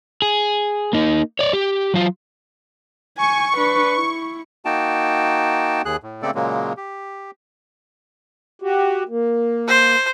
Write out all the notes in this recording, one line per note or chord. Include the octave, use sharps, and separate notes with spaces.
G#4
A#3 D#4
C#5 D5
G4
F#3 F4
G#5 C#6
D4 B4
E4
A#3 D#4 F#4 G5 A5
D#2 G#4 F#6
A2
C#3 A3 A#3 C4 A4 D5
A#2 C#3 F#3 G#3 A#3
G4
F#4 G4
A#3
C5